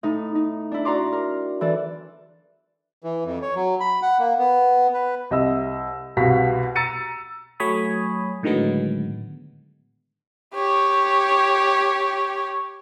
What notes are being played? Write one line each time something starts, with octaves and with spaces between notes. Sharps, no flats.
A2 D#4
D#4
D4 E4
F#4 D5 A#5 C6 D6
A#4
E3 A4 D5
E3
F2
C#5
F#3
B5
F#5
A#3
B3
B4
C2 C4 D#5 E5 E6
C2 B2 F#4 F5 B6
A#5 E6 A6 C#7 D#7
F#3 A3 C#5 G#5 B5 D#6
A2 D3 D#3 F#3 G#3 B3
G4 C#5